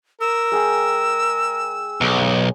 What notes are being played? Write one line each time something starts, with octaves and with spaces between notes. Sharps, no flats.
A#4 E6
G#3 G#4 G5
B1